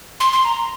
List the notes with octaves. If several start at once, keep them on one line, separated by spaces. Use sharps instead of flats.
C6
C6
A#5